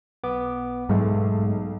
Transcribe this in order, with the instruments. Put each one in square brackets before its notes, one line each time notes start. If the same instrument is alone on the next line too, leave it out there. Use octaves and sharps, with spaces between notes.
[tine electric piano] B1 B3 D6
[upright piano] B1 [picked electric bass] G#2 [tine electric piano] G#3 A3